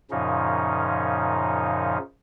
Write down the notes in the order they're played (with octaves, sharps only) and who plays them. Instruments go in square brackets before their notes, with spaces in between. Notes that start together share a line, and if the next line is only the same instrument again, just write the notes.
[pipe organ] F#2 A#2 C#3 F3 C#4 D#4